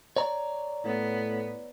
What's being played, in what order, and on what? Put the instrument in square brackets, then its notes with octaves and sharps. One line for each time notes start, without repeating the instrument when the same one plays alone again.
[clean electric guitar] C#5 D5 A#5
[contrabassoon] A2 [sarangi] B3